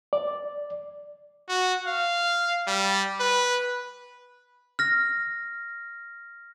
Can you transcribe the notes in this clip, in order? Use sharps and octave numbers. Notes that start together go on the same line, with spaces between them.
D5
F#4
F5
G3
B4
F6 A#6